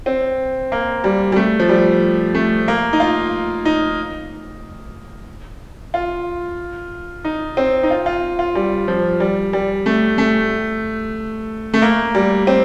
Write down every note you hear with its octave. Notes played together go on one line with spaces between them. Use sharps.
C4
A#3
G3
G3
A3
F3
G3
A3
A#3
D#4
F4
D#4
F4
D#4
C4
D#4
F4
F4
F4
G3
F3
G3
G3
A3
A3
A3
A#3
G3
C4